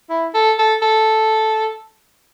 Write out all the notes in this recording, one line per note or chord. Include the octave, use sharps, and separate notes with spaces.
E4
A4
A4
A4